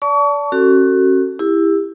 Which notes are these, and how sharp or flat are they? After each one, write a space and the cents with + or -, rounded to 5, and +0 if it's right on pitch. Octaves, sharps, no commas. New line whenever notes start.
D5 -30 A5 +0 C#6 +35
C#4 -35 F#4 +20 A4 +35
E4 +0 G4 +30